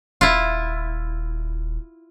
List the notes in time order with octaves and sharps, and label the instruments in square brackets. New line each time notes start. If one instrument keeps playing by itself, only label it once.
[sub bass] D#1 [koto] E4 F4